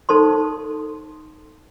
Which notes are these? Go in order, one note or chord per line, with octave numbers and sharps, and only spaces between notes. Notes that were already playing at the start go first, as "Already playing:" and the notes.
D#4 A4 C5 C6